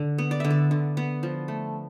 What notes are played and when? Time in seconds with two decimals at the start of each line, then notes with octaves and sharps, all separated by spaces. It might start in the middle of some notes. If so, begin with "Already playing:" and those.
Already playing: D3
0.18 B3
0.31 D5
0.40 D3 E5
0.50 D5
0.71 D3
0.97 B3
1.23 F3
1.48 A3